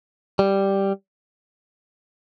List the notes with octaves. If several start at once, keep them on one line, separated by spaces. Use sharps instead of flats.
G3